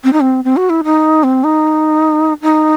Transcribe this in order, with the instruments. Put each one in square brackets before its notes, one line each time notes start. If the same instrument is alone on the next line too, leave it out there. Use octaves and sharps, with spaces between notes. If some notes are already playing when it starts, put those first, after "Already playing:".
[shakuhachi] C4
D#4
C4
C4
F#4
E4
D#4
C4
D#4
D#4